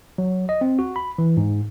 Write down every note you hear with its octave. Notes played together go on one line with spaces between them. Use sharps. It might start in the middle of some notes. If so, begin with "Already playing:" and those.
F#3
D#5
C4
F#4
B5
E3
G#2